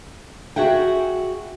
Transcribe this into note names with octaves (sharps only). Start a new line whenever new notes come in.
F#4 G#4 E5 F#5 G5